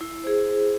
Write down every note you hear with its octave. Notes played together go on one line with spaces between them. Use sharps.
E4
G#4 C5